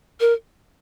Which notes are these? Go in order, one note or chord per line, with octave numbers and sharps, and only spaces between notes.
A#4